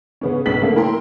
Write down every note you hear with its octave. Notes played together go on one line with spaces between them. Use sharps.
C#3 B3 C#4
B1 B3 C#4 B6 F#7
C#3 A3 A#3
E4 A#4 G5 A#5 C6